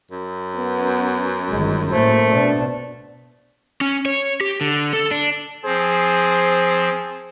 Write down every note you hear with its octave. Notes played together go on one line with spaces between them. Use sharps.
F#2
B3
G1 D#3 G#3
A2 A3 A#3 C5
B2 D4
C#4
C#5
G4
D3
A4
D4
F3 C4 G#4 C5